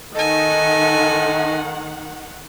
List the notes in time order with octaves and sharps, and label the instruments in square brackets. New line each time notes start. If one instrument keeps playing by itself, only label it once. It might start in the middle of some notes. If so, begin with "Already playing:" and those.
[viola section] D#3 F#5 [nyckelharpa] A4 G#5 [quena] D#5